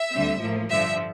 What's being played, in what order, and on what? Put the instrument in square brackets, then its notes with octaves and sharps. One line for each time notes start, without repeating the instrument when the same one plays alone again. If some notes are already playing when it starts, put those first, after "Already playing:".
Already playing: [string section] E5
D2 D3 G3 C4
A1 A2 F3 A#3
G2 D3 F3 E5